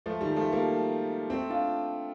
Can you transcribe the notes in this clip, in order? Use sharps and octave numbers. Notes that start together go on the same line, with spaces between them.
F3 A3
D#3 G3
F3 A3
G3 A#3
A3 C4
D4 F4